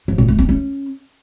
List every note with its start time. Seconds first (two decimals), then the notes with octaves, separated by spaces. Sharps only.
0.08 F3
0.18 A#2
0.28 A3
0.39 C4
0.49 C#4